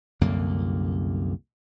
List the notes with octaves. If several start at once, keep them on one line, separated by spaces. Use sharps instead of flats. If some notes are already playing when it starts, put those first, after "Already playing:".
C2 F#2 D3 A#3